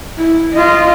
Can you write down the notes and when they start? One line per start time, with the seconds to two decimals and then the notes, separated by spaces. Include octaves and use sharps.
0.17 E4
0.53 F4 D#5